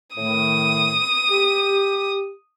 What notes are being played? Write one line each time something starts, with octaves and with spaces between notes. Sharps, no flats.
A2 D#3 A3 D#6
G4